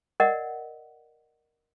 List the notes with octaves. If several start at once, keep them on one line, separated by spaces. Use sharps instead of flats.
A#4 D5 D#5 F#5